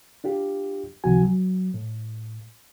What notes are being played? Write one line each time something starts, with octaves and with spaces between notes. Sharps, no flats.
D4 F4 G4
C#2 C3 D#3 F3 F#4 G#5
F#3
A2